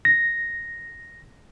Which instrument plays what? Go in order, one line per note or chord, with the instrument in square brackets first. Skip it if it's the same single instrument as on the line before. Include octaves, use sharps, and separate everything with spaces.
[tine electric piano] A#6